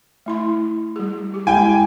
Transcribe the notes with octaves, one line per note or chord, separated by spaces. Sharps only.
A3 E4 C6
G3 G#4
G4
G#3 E4 G5 G#5